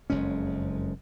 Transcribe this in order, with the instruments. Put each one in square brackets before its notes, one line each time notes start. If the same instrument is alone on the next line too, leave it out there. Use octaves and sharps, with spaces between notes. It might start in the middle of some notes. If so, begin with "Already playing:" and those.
[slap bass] F#1 F2 G#3 C#4